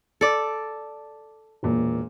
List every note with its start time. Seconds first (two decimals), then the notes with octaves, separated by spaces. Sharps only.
0.21 A4 D5
1.63 E1 A#2